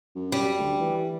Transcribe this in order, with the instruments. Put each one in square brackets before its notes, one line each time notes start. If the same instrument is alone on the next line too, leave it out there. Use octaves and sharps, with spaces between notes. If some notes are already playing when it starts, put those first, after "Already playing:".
[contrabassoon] F#2
[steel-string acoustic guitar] G3
[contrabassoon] D2
E3